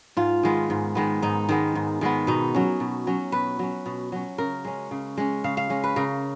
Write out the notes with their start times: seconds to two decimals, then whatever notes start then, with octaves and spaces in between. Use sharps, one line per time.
0.17 G#2 F4
0.43 D#3 G#3 B3
0.70 G#2
0.95 D#3 G#3 B3
1.22 G#2 D#4
1.49 D#3 G#3 B3
1.75 G#2
2.01 D#3 G#3 B3
2.27 B2 D#4
2.54 F#3 C#4
2.80 B2
3.07 F#3 C#4
3.32 B2 B4
3.59 F#3 C#4
3.86 B2
4.12 F#3 C#4
4.38 C#3 A#4
4.65 G#3 C#4
4.91 C#3
5.17 G#3 C#4
5.44 C#3 F5
5.57 F5
5.70 G#3 C#4
5.84 B4
5.96 C#3 A#4